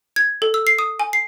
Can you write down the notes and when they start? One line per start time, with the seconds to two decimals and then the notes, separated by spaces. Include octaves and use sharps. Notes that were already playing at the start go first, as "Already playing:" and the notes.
0.16 G#6
0.42 A4
0.54 E6
0.67 C7
0.79 D#6
0.99 G#5
1.13 C7